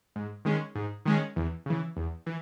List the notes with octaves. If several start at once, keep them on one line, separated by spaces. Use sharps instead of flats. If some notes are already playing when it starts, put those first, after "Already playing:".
G#2
D#3 G#3 C#4
G#2
D#3 G#3 C#4
E2
C#3 E3
E2
E3